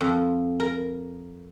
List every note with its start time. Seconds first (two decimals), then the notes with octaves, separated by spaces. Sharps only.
0.01 F2
0.60 A#4